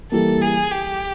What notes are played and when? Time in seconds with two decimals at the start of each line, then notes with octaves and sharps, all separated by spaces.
0.11 E3 G3 A#3 A4
0.42 G#4
0.72 G4